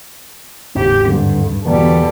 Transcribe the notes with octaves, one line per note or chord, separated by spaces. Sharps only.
F#1 D#2 G#2 C4 G4
G2 D3
E1 B2 D3 E3 G3 A#3 A4